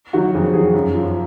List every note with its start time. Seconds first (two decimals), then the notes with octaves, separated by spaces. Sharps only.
0.13 D#3 F#3 F#4
0.34 F2 G#4
0.54 D#3 F#3 G#4
0.74 F#2
0.94 F3